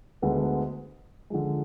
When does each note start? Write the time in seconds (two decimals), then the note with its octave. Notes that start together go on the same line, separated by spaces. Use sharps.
0.22 D2 D3 G#3 B3
1.30 D3 F3 G#3